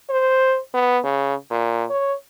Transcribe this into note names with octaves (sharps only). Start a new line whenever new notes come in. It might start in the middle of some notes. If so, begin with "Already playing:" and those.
C5
B3
C#3
A#2
C#5